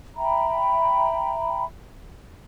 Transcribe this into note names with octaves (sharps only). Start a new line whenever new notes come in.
E5 G5 A#5 B5